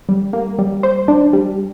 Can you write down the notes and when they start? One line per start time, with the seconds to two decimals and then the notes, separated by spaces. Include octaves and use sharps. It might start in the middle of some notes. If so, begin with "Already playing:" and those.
0.09 G3
0.33 A#3
0.59 G3
0.83 C5
1.08 D4
1.33 G3